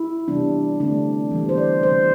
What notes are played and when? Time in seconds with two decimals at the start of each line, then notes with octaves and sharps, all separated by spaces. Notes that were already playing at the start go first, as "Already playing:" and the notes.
Already playing: E4
0.28 C3 E3 G3 B3 D4
0.80 D3 A3 C4 D4
1.31 E3 G3 B3
1.49 C5
1.57 D5
1.83 C3 E3 G3 C5